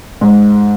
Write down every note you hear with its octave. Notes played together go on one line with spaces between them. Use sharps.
G#2 G#3